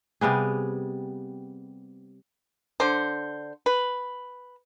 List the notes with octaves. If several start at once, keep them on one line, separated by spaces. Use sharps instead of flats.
C3 G3 B3 G#4
D3 C5
B4